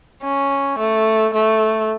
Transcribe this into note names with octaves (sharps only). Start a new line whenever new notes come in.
C#4
A3
A3